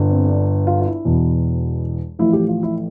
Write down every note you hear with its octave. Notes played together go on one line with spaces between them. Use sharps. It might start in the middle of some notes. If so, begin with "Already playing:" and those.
Already playing: G1 G2 D3
C4
D4
F4
F4
E4
E1 E2 B2
A1 A2 F3 E4
G4
F4
E4